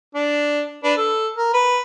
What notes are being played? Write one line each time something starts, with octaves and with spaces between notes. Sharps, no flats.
D4
D4 B4
A4
A#4
B4